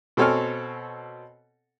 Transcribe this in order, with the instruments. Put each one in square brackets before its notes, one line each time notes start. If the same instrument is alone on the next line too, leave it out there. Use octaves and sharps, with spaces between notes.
[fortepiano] B2 C4 A4 C#5 G#5 F6